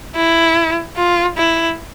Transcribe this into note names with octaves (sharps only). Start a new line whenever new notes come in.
E4
F4
E4